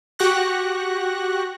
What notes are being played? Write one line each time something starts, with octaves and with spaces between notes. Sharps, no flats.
F#4 G4 C#6 F#6 A#6